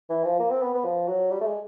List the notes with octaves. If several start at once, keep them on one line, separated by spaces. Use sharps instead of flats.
E3
F3
A#3
C4
B3
B3
F3
F#3
G3
A3
G#3